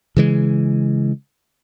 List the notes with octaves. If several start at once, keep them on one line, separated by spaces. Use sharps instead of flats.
C#3 E3 G#3